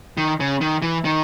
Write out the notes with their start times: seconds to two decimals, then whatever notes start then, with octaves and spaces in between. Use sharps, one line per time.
0.17 D#3
0.40 C#3
0.61 D#3
0.82 E3
1.05 D#3